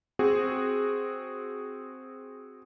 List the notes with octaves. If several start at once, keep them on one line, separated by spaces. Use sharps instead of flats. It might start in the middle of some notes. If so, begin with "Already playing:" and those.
C4 F#4 G#4